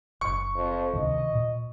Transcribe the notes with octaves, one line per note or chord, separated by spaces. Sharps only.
F#1 C#6
F2
D2 C3 D#3 D#5
A#2